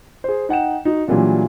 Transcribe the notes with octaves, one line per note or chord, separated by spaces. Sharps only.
G#4 C5
D#4 F#5 G5 E7
D#4 F#4
A#2 E3 F#3 G3 D4 F4